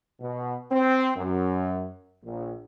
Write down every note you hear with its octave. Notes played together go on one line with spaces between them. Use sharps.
B2
C4
F#2
A#1